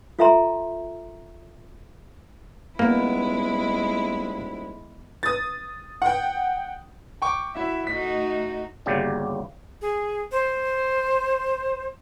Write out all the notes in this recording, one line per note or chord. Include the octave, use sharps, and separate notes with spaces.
F4 A4 E5 G#5 A#5 C6
D#1 G#3 A#3 B3 E4
D#6 A6
F#5 G5
G5 C#6 D6
E4 F#4 E5
A3 D#4 F#4 B6
G1 D#2 C#3 F#3 G4 D5
G#4
C5